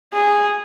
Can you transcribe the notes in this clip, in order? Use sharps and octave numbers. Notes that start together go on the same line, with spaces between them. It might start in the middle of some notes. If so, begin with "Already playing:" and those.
G#4